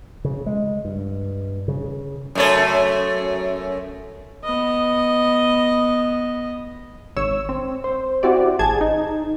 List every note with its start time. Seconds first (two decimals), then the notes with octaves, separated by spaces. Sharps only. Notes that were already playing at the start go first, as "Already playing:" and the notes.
0.25 C#3
0.46 G#3
0.85 G2
1.68 C#3
2.35 F#2 A3 C#5
4.44 B3 D#5
7.16 G#1 C#5 E6
7.49 C4
7.84 C5
8.23 C4 E4 F#4 G4 D5
8.59 G#1 G#4 A5 G#6
8.81 D#4